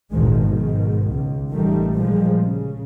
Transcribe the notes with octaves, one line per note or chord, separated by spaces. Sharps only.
G#1 D2 A#2 D#3 F3 G#3
G#2 B2 D#3
C#2
A1 D#3 G3 A3
A#2 F3 G3 G#3
C#3